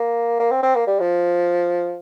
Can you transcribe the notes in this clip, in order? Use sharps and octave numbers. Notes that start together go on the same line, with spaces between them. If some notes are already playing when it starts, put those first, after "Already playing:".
Already playing: A#3
A#3
C4
C4
A#3
G3
F3